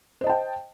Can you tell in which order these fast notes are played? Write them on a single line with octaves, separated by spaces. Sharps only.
C5 D#5 A5 G5